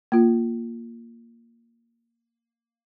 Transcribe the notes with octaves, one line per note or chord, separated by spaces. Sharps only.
A#3 F4